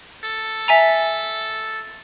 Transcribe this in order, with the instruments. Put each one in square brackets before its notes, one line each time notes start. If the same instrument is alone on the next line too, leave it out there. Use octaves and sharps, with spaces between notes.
[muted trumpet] A4
[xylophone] E5 G#5 A#5